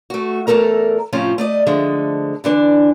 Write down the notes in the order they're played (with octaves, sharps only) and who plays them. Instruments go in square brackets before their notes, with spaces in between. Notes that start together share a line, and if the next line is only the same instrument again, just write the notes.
[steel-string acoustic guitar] A3 F#4
E2 A3 A4 A#4 A#5
A2 C3 F3 C#4 F4
A3 D5 D#5
D3 F3 G#3 A3
D3 E3 D4